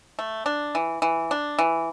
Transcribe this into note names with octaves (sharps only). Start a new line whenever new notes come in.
A3
D4
E3
E3
D4
E3